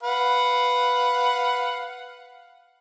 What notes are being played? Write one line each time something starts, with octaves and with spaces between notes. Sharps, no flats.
B4 F5 F#5